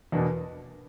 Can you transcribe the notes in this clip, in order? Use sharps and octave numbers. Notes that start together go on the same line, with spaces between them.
E2 B2 A#3 D4 F#4